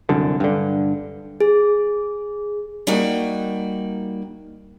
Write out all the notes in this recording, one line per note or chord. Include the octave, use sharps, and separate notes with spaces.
C2 F#2 D3
G2 D3
G#4
G3 A#3 D#4 F#4 G5